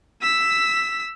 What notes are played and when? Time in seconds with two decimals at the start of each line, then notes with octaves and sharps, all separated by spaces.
0.22 E6 B6